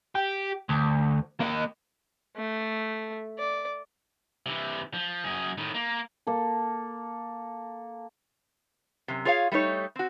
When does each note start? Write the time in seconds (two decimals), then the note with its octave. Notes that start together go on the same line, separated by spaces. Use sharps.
0.15 G4
0.69 D2
1.41 A#3 D#5
2.36 A3
3.39 D5
4.46 C3 E3
4.94 F3
5.24 F#2 G#4
5.58 A2 D#3
5.74 A#3
6.27 A#3 A4
9.08 F#2 C3
9.25 F4 G#4 C#5 D#5 F5
9.52 G3 A3 D#4 C#5
9.96 C4 F#4